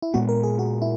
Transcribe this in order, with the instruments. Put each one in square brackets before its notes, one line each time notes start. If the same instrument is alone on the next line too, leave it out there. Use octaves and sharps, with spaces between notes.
[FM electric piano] E4
[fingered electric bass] A#2 G#3 B3 [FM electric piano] F#4
[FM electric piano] A#4
G#4
F#4
E4